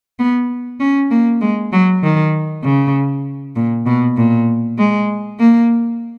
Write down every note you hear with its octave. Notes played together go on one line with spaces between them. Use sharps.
B3
C#4
A#3
G#3
F#3
D#3
C#3
A#2
B2
A#2
G#3
A#3